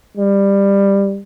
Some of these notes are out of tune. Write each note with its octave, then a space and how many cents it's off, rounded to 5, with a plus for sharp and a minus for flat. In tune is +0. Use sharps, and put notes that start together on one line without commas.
G3 +15